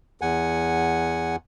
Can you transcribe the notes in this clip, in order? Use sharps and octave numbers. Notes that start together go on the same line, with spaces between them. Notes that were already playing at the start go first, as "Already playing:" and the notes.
E2 F#5 G#5